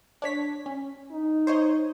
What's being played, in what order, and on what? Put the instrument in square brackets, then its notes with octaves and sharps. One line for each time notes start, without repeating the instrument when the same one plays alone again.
[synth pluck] D4 C#5 B6
C#4
[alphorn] D#4
[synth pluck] C5 C#5 D#5